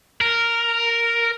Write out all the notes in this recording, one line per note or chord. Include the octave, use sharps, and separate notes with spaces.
A#4